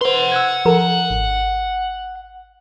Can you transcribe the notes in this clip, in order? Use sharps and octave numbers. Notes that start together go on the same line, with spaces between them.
B4 C5 F#5 C6
E6 F#6 G#6
F3 A4 A#4
G#1